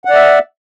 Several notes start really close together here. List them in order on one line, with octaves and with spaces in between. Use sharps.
F#5 D5 E5